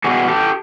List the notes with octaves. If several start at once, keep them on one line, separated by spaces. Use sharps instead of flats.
B2 G3 B3 F#4 G#4
G4 A4